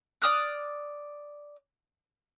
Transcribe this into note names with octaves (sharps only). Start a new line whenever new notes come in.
D5 D#6 F6 F#6